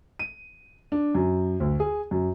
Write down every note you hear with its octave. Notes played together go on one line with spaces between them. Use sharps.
D#7
D4
F#2
D2
G#4
F#2